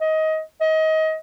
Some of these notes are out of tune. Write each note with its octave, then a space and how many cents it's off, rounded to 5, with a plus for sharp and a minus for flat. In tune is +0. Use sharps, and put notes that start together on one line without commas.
D#5 +20
D#5 +25